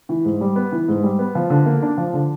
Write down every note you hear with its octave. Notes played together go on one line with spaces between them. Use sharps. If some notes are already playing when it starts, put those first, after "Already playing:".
E3
G#2
G3
B3
E3
G#2
G3
B3
F3
D3
A#3
D4
F3
D3